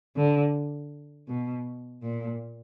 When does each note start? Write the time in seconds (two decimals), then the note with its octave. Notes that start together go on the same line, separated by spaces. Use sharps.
0.16 D3
1.29 B2
2.03 A#2